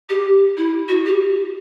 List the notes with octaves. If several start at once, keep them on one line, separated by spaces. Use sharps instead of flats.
G4
E4
F#4
G4